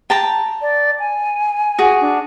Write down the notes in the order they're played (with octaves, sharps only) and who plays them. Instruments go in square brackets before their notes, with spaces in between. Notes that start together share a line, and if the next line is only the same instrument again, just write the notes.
[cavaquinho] G5 A5 A#5
[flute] D5
G#5
[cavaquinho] F#4 G#4
[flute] D4